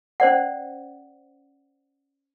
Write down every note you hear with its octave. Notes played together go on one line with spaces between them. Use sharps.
C#4 C5 D5 F#5